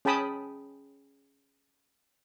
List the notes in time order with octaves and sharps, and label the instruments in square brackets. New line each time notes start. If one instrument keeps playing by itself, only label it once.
[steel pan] C#4 G#4 G5 A5 B5 D#6